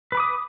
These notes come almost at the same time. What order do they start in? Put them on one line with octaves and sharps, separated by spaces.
B4 B5 D6 D#6